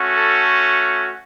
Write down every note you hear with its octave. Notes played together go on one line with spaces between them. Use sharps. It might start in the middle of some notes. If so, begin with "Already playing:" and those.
Already playing: A3 C#4 F#4
A4